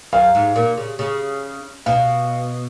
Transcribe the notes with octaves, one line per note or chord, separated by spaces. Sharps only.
F#2 F5
G#2
A#2
C#3
C#3
B2 F5